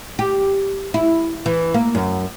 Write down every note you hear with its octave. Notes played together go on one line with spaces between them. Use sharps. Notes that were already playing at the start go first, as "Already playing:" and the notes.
G4
E4
E3
A#3
F#2